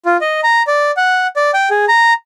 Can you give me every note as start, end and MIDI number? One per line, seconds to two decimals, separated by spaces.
0.05 0.17 65
0.21 0.40 75
0.43 0.63 82
0.67 0.91 74
0.97 1.27 78
1.36 1.51 74
1.54 1.69 79
1.70 1.85 68
1.88 2.13 82